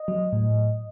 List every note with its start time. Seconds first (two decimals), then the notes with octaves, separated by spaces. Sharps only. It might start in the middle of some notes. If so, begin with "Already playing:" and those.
Already playing: D#5
0.08 F#3
0.32 A2